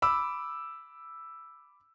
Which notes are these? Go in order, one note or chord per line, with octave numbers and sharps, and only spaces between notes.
B5 D6 E6